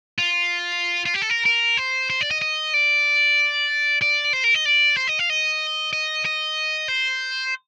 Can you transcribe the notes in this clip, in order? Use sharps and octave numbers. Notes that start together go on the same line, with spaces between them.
F4
F4
G4
A4
A#4
A#4
C5
C5
D5
D#5
D#5
D5
D5
C5
A#4
D#5
D5
C5
D#5
F5
D#5
D#5
D#5
C5